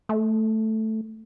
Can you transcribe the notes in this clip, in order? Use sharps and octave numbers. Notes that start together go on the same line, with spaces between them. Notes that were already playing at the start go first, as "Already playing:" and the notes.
A3